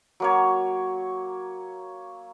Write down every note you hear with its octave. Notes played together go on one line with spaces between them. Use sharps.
F#3 A#3 C#5